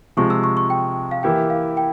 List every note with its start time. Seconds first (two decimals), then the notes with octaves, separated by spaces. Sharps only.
0.17 C3 F3 G#3 C#6
0.30 E6
0.44 C#6
0.57 C#6
0.70 G5
1.11 F5
1.23 E3 A#3 E4 G4 G5
1.50 F5
1.77 G5